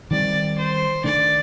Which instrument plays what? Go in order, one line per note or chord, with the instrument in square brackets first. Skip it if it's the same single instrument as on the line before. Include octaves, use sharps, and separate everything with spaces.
[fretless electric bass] D#3 G3 C4 [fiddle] D5
[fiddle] C5
[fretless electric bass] D#3 A3 D4 [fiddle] D5